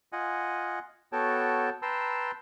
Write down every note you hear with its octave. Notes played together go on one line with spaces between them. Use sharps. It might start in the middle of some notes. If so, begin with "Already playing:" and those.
F4 D#5 F#5 G#5
B3 F#4 A4 C#5 G5 A5
B4 G5 A5 A#5 C6 E6